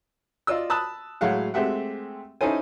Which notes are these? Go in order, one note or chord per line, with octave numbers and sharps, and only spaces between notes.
F4 D5 D#5 E6
A5 B5 D#6 E6 F#6
A2 F#3 G#3 F5 F#5
G#3 A3 C4 G4 E5 F#5
C#4 D#4 E4 A4 C5 G#5